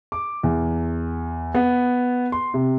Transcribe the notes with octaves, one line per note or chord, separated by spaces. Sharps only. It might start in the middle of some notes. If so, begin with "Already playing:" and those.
D6
E2
B3
C6
C3